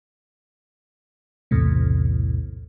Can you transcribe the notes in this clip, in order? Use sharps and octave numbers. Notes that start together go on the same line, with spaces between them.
B1 E2 A2 C3